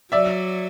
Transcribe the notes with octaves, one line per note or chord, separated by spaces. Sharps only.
F#3 D5 E5